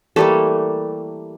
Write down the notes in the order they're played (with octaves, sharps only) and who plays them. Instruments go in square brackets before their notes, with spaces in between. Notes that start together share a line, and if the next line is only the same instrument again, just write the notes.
[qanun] E3 G3 A3 A#3 A4